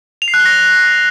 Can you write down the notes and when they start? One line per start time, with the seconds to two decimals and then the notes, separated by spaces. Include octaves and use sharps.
0.22 F7
0.28 C7
0.34 F#6
0.40 G7
0.45 A#6